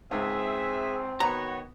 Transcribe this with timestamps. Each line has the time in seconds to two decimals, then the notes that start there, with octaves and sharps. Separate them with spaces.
0.11 C#2 G#2 C4 G#4 E5
1.20 D#3 B3 F#4 B4 C#5 A#5